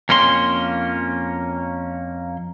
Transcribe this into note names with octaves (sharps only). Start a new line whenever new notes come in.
F2 A#3 C#4 C6